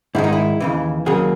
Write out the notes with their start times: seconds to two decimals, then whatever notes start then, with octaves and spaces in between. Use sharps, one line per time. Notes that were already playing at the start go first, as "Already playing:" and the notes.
0.15 G#2 D#3 G#3 E4
0.24 D#4
0.33 E4
0.60 D#2 C#3 E3
1.06 D#2 C#3 F#3 A#3 G#4